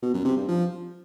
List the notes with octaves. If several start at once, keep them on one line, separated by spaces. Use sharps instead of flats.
B2
F#2
C3
G2
F3